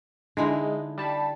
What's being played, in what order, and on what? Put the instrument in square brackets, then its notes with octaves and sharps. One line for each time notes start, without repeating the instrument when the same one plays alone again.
[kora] D3 D#4 E4 [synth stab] G#3
[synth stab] G3 A5 B5